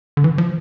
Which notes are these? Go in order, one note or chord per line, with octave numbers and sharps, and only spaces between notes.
D3
E3
F3